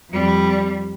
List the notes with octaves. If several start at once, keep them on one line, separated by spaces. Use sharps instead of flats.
F2 G3